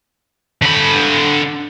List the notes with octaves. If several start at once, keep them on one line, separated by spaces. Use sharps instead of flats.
D3 B5